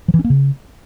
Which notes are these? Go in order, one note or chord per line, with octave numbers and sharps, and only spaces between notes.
F3
E3
C#4
A#3
C#3